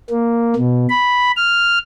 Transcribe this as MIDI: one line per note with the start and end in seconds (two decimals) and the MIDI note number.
0.10 0.54 58
0.56 0.86 47
0.89 1.31 83
1.36 1.78 89